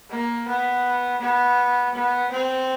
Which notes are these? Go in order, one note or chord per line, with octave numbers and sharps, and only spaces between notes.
A#3
B3
B3
B3
C4